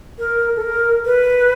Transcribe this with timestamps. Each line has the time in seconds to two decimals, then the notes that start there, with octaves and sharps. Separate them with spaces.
0.19 A#4
0.56 A4
0.62 A#4
1.06 B4